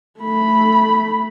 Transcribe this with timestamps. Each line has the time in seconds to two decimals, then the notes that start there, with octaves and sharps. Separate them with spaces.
0.20 A3 B5